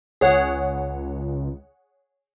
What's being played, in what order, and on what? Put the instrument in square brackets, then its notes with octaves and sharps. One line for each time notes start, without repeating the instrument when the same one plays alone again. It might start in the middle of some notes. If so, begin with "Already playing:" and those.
[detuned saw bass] C#2 [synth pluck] G#4 C#5 F#5